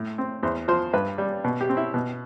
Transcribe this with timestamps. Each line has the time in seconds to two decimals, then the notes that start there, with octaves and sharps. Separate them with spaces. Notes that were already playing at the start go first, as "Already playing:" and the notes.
Already playing: A2
0.18 C4
0.43 E2 C5
0.68 F3 C5
0.93 G2 B4
1.18 G3
1.44 B2
1.61 G4
1.69 C4
1.77 E4
1.94 B2